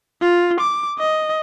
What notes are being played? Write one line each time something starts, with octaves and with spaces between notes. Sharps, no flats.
F4
D6
D#5